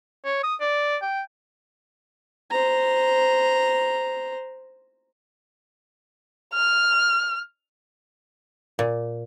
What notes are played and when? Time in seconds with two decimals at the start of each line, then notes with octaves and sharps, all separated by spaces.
0.25 C#5
0.44 D#6
0.61 D5
1.02 G5
2.51 C5 A#5
6.53 F6
8.79 A#2